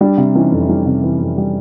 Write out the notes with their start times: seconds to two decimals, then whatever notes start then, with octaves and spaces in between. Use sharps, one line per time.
0.01 G3 D4
0.18 C3
0.35 E3 C#4 D#4
0.52 F2
0.69 G3 C#4 D#4
0.86 C3
1.03 E3
1.20 F2
1.38 G3